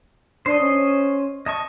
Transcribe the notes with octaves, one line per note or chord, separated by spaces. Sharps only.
D4 C5 D#5
C#4
D#5 A5 C#6